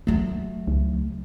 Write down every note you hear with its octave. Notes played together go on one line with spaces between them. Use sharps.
F#3 A3
C#2